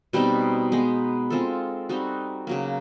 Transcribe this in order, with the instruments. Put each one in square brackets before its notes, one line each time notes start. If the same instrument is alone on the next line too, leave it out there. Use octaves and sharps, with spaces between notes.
[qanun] B2 G3 C4 D#4
G#3 B3 D#4
G#3 C4 F4 A4
G3 C4 D#4 F#4
C#3 F#3 A#3